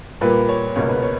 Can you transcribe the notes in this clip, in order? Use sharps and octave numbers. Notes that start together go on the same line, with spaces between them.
A#2 G3 A#3 B4
C#5
C#2 B2 A#3 C#5
B4
C#5